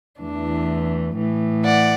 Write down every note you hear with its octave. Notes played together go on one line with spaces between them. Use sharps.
E2 E3 A3 D4
A2 E3 A3
D5 F#5